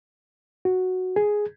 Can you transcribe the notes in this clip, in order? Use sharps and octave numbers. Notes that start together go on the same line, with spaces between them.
F#4
G#4